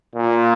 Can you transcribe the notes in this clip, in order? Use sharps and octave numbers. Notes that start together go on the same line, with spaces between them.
A#2